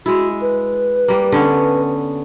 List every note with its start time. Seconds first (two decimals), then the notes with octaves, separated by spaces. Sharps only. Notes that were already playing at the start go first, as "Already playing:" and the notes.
0.06 G#3 E4 F#4
0.42 B4
1.08 G3 A#3
1.32 D3 B3 C#4